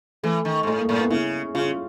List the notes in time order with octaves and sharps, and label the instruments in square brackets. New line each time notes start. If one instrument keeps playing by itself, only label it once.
[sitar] E3 [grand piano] A3
[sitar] D#3
G#2
[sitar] A2 [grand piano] A3
[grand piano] A#3
[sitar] A2 [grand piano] A#3
[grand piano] B3
[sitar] C#3 [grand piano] E4
[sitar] C#3 [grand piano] F4